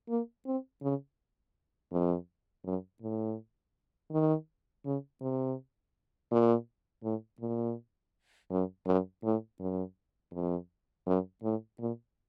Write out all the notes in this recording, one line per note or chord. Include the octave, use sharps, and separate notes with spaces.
A#3
C4
C#3
F2
F#2
A2
D#3
C#3
C3
A#2
A2
A#2
F#2
F#2
A2
F#2
F2
F#2
A2
A#2